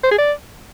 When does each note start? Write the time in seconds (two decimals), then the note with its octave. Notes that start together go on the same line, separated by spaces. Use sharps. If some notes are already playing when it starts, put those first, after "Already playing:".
0.04 C5
0.11 G#4
0.19 D5